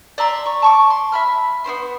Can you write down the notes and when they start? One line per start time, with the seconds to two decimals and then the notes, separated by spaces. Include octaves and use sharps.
0.18 D5 E5 A#5 C6
0.46 C#6
0.62 A5 C#6 D6
0.90 C6
1.12 E5 B5 F6
1.64 B3 C#4 C5 C6